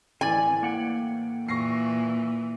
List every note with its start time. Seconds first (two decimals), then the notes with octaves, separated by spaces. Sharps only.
0.21 A2 E3 C4 D5 G#5
0.63 A#3 F#5 G5
1.48 A#2 E3 C#6 A#6 C7